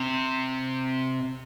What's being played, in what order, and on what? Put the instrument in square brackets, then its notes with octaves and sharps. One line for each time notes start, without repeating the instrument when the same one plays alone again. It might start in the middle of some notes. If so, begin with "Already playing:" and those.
Already playing: [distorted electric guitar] C3